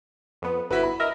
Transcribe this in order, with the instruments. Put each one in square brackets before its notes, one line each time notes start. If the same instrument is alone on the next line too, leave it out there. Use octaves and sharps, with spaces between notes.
[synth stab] F2 B3
[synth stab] G1 B6 [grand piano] E4 F#4 B4
[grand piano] B5
[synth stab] A#4 D#5 E5